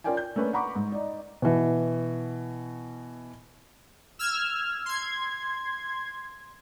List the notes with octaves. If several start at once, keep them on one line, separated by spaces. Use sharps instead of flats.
C#4 F4 A#4 D5 G5 G#5
G6
A3 A#3 C#4 D4 B4
F#5 A#5 B5 C#6 D6
G#2
D#4 D5
B2 E3
E6 F6 G#6
C6 G#6